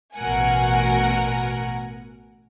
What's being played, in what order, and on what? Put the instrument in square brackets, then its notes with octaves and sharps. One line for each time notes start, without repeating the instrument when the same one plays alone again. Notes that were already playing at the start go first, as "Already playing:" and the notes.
[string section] A1 B2 A#4 F#5 G#5